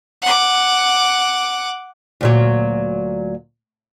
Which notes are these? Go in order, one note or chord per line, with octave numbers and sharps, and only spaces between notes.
F#5 D6
D2 A#2 F#3